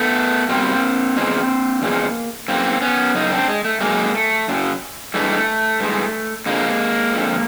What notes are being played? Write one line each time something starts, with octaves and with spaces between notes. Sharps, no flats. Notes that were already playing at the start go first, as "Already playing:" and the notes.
Already playing: A3 B3
B2 G3 A#3 C4
E2 C#3 F3 G#3
E2 C#3 F3 G#3
F#2 C#3 E3 A#3 C4
B3 C#4
F#2 C#3 D#4
C4 D4
G#3
A3
F#2 C#3 F#3 G#3 A#3
A3
F#2 C#3 F#3
G2 E3 G#3 A3
G2 E3 G#3
F2 D3 F3 G#3 A#3
F2 D3 F3